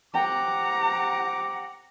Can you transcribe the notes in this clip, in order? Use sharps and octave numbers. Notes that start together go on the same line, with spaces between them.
G4 C5 F#5 G5 A#5 D6